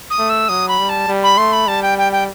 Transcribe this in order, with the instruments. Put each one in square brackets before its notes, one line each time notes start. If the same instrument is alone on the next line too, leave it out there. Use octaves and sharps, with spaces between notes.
[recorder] D#6
[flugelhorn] A3
[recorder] E6
[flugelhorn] F#3 [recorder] D#6
[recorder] B5
[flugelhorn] G3
[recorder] A5
[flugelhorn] G3
[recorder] B5
[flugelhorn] A3 [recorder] C6
[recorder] B5
[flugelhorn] G3 [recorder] A5
[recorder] G5
G5
G5